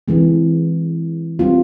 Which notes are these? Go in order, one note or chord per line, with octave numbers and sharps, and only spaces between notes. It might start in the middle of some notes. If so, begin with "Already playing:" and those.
E3 G#3 C4
G3 C4 F4